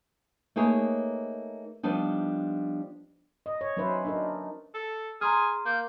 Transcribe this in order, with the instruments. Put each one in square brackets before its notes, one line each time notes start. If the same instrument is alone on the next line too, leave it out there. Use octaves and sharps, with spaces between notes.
[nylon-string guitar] A3 A#3 D#4 G#4 B4 C#5
F3 G3 B3 D4 D#4
[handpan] D#5
C#5
F#3 C#4 D#4 B4 C5 E5
D4 D#4 A#4
[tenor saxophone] A4
[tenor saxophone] G#4 [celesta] A#5 C6 F6
[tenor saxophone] A#3 [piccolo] G6